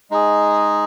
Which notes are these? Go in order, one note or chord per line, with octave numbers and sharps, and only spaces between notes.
G#3 D#4 G#4